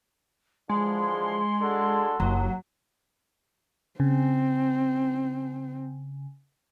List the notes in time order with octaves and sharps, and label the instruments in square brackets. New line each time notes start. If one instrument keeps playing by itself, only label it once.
[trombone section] D3 E3 F3 [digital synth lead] G#3 [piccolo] C6
[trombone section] D4 F#4 A4
[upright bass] F#1 [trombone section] D#2 [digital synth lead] F#3
[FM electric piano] C#3 [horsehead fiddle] C4